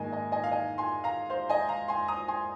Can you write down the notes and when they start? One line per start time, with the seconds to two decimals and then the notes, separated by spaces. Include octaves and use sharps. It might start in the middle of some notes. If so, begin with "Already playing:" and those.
Already playing: G#2 D#3 A#3 D#5 G#5
0.12 D#5 G#5
0.32 D#5 G#5
0.44 F5
0.51 D#5 G#5
0.78 G#5 C6
1.04 F5 A#5
1.30 C5 F5
1.50 D#5 G#5
1.69 F5 A#5
1.88 G#5 C6
2.08 A#5 D#6
2.28 G#5 C6